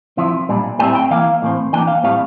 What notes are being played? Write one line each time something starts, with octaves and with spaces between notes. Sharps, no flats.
F3 C4 E4
A#2 G3 D4
A2 G3 C4 E4 G5
G5
E3 A#3 E4 F5
A2 E3 A3 C4
E3 A#3 D4 G5
F5
A2 G3 C4 F5